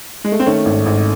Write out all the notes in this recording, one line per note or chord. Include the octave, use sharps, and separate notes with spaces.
G#3
A3
C4
D#3 A3 C#4
G#1
G#1